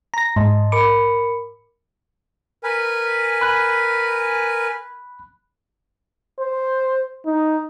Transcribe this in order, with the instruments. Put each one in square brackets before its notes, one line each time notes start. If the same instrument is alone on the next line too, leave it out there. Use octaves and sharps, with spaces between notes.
[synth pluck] A#5 A#6
[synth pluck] G#2 [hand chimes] D#5 A5 C6
[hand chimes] A#4 B5 C#7 [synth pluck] D6
[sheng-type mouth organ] A#4 B4 G#5
[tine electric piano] B5 F#6
[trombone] C5
D#4